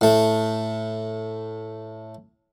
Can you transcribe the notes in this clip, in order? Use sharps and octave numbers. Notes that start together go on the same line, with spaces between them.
A2 A3